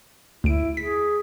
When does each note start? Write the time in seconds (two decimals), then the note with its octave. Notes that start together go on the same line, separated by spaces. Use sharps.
0.44 D2 E4 D7
0.77 G#4 B6